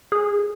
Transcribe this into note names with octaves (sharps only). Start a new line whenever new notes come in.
G#4